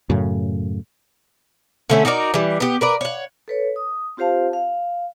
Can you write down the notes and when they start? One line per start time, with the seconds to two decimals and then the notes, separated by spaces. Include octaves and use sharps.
0.10 F#2 A2 C#3
1.90 D3 A3 C#4
2.05 D#4 F#4 A#4 D5
2.34 E3 G3
2.60 B3 G4
2.81 A#4 B4 D5
3.01 C#5 F#5
3.48 A4 B4 C#5
3.76 D#6
4.17 C4 F4 G4 C5 F5 A5
4.53 F5